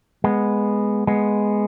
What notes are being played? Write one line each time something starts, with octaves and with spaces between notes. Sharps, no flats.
G#3 B3
G#3 B3